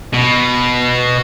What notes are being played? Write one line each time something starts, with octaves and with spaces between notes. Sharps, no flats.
B2